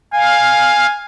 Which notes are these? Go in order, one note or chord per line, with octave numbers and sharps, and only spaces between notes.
F5 G#5